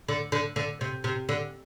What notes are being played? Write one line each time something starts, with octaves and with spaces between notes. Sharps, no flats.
D3
D3
D3
C3
C3
D3